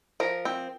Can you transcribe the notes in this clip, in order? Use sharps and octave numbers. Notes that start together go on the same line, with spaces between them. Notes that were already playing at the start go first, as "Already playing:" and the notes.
F3 A#4
C4